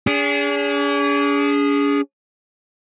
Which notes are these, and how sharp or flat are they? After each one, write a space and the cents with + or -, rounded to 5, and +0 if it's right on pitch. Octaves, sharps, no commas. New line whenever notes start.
D4 -45 G#4 -15